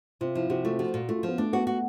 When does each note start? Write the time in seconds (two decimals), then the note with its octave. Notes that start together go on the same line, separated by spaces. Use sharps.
0.21 C3 F4
0.35 F3 E4
0.50 C3 F#4
0.64 A3 F4
0.79 F3 F#4
0.94 A#2
1.08 A3 F4
1.18 F3 F4
1.28 B3
1.38 A3 D4
1.53 B3 F#4
1.67 F#4